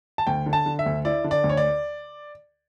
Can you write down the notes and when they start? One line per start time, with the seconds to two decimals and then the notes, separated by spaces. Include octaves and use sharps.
0.18 A5
0.27 D2 G5
0.46 D3
0.53 A5
0.66 D3
0.79 E5
0.86 D2
1.05 E4 D5
1.24 D3
1.31 D5
1.44 D2
1.50 C#5
1.57 D5